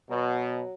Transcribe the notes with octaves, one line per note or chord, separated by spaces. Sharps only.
B2 F#3